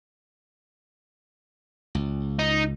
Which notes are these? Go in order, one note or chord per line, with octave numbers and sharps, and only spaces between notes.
C#2
D#4